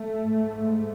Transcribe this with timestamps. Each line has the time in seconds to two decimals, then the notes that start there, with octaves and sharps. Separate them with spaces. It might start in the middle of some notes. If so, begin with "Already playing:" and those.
Already playing: A3
0.23 G#2